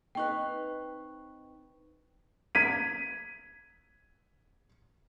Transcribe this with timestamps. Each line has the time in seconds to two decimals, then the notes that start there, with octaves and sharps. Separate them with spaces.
0.15 C4 D#4 B4 G5 C#6 F#6
2.55 G#6 B6 D#7